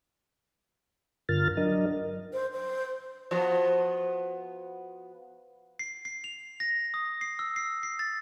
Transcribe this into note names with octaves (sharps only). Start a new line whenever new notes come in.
G2 D3 F4 A#4 F6 A6
F#3 D4 A#4 D#5
C5
C5
F3 B3 F#4
C7
C7
F7
A#6
D#6
C7
E6
C7
C7
A6